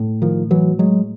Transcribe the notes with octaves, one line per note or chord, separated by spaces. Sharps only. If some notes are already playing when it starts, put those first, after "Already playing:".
Already playing: A2
D#3 F3
E3 F#3
F#3 G#3